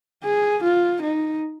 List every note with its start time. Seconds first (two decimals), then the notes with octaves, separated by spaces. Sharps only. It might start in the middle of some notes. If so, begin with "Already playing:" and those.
0.23 G#4
0.63 F4
1.02 D#4